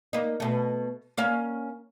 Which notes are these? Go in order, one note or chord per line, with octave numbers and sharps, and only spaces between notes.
A#3 D#4
B2 A3
A#3 C#4 F5